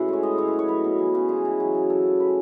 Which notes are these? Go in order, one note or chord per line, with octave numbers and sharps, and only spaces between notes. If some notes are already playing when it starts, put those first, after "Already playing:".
Already playing: A2 C#3 E4 F#4 B4
G#3 C#5
G#3 D#5
A2 C#5
B4
F#3
C#5
F#3 B4
B2
E3
C#3 F#4
G#3 G#4
E3
F#3
F#3
F#3 A4
C#3
G#3 B4